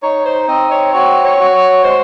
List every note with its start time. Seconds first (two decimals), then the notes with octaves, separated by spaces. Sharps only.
0.03 D#4 C#5
0.25 C5
0.48 C4 D#5
0.71 C#5
0.93 F#4 C#5
1.24 C#5
1.39 F#4
1.55 C#5
1.84 G#3 C5